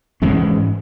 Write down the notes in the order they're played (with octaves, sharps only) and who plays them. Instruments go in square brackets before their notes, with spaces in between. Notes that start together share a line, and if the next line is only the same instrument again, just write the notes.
[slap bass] G#2 E3 G#3 C#4